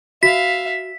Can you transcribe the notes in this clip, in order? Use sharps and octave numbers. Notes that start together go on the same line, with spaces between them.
F#4 E5 F5 B6